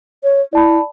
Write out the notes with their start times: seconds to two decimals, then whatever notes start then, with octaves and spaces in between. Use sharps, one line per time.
0.24 C#5
0.53 E4 D5 A5 B5